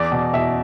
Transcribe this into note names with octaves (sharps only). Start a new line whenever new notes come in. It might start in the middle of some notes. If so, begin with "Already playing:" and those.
Already playing: E2 D5
B2
B2 E5